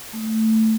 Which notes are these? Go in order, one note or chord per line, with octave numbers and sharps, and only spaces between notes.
A3